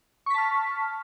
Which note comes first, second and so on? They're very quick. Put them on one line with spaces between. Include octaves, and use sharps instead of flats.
C#6 B6 A5 F6